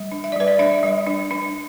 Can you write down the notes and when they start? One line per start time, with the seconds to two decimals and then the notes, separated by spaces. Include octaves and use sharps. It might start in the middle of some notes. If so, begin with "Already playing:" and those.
Already playing: G3
0.12 D4
0.24 E5
0.32 D5
0.36 G3 B4
0.48 D5
0.59 D4 E5
0.83 G3
1.07 D4
1.31 D4